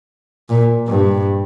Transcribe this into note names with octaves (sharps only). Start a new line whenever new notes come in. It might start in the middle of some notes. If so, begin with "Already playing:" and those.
A#2
G2